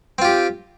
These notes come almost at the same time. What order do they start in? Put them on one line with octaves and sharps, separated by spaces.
C4 F4 G4